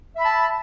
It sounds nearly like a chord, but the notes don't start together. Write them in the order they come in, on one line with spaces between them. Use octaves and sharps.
E5 B5 A5